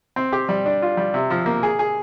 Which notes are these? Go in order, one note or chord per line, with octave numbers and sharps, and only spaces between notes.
C4
G4
G3
D4
F4
G3
C3
F3
A#3
G#4
G#4